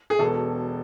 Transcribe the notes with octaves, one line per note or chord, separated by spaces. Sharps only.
G#4
E1 B2 A4